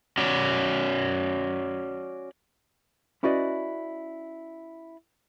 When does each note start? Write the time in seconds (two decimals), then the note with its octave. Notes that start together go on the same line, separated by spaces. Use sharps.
0.17 C#4 F#4 D5
3.23 C#4 E4 F#4 B4 D5 D#5